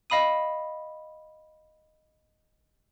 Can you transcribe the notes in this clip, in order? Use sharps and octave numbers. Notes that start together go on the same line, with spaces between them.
D#5 F5 B5 D#6 D#7